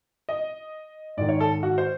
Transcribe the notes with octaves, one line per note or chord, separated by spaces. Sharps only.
D#5
G#2 D#3 D5
C#5
A4
F#4
C5